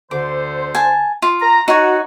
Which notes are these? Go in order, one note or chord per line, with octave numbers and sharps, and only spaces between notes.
D2 D3 C5 D6
G#5 A5
F4
A#5
D#4 F#4 C#5